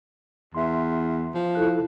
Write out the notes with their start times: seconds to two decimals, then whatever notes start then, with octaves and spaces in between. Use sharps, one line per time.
0.55 E2 E5 C6
1.35 F3
1.55 E4 A4 F#6